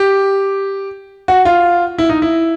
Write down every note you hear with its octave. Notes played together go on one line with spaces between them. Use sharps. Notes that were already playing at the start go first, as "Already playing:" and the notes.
Already playing: G4
F#4
F4
E4
D#4
E4